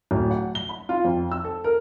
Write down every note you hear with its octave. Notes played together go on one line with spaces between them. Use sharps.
D1
F#5
G7
B5
F4
F2
E6
A4
A#4